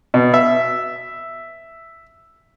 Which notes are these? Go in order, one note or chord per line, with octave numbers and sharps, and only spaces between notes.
B2
E5